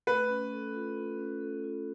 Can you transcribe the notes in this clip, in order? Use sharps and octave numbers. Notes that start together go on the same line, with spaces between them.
A3 B4
C#4
A4
F4
F4
C#4
A4
F4